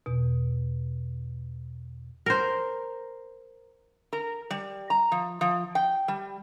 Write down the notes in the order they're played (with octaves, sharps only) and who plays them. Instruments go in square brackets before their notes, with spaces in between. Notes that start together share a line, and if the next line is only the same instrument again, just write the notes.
[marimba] E2 B2
[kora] A#4 C5
[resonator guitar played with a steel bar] A#4
G3
A#5
F3
F3
G5
G3